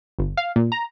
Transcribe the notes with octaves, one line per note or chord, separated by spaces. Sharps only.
G1
F5
A#2
A#5